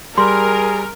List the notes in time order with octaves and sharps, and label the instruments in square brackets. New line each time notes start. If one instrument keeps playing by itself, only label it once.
[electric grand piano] G3 [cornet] G#4 [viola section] A#4 [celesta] C6